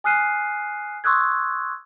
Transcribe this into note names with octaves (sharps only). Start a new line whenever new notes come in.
G#5 D#6 F6 F#6 C7 D#7
C6 C#6 D#6 E6 F#6 G#6